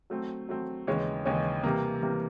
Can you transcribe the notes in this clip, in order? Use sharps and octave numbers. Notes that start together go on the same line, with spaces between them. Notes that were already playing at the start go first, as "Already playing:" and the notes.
F#3 A3 C4
F#3 A3 C4
D#2 C#3 E3 G#3 C#4
D#2 C#3 E3 G#3 C#4
C3 E3 G3 A#3
C3 E3 G3 A#3